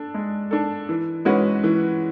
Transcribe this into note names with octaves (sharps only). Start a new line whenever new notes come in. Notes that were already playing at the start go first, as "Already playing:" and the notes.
Already playing: D4 A4
G#3
D4 A4
E3
G#3 C#4 F#4 B4
E3